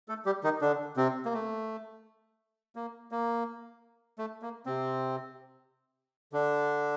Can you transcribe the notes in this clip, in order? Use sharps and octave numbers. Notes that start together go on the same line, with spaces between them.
A3 A4
G3 G4
D#3 D#4
D3 D4
C3 C4
A#3
A3
A#3
A#3
A3
A#3
C3 C4
D3 D4